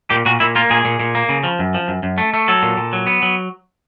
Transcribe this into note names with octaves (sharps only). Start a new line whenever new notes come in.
A#2 G4
A#2 F#4
A#2 E4
A#3 F4
A#2 G#4
A#2
A#2
A#3
C#3
F3
F#2
F3
F#2
F#2
A3
A3
F#3 A4
A#2
A#2
F#3
B3
F#3